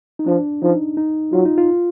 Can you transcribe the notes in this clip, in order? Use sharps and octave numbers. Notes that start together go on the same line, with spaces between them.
D#4
F3 D4
F3 D#4
D#4
F#3 F4
D#4
F4